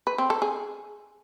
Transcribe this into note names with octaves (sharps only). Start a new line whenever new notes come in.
B4
C4
A4
G#4